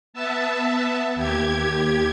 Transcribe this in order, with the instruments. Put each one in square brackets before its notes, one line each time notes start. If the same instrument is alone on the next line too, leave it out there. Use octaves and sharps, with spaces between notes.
[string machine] B3 E5 A5
D#2 G4 G#6